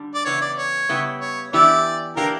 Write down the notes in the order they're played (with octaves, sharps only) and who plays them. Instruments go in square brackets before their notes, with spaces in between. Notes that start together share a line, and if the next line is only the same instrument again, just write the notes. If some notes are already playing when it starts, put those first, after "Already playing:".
Already playing: [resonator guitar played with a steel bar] D3 G3 D4
[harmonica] D5
[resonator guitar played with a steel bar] C#3 E3 B3 [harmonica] C#5
[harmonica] D5
C#5
[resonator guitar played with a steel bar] C#3 G3 B3 E4 G4
[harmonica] C#5
[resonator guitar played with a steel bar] E3 B3 E4 G4 [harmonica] D5
[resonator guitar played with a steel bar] E3 A#3 D4 G4 [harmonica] A#4